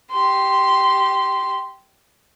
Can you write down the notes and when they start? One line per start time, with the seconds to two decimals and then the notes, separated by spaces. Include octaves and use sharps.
0.12 G4 C6